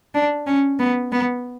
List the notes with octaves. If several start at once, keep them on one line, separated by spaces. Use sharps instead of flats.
D4
C#4
B3
B3